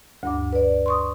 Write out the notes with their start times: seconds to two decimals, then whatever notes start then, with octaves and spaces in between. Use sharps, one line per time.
0.23 D2 G2 D6
0.53 B4 D5
0.86 C6 C#6 D#6